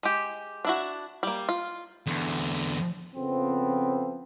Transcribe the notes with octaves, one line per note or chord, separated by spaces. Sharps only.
G#3 G4
D4 E4 F#4
G3 A#3
F4
E2 D3
F2 C#3 F3 B3 C4